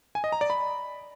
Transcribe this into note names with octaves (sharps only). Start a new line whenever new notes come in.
G#5
D#5
A#5
D5
B5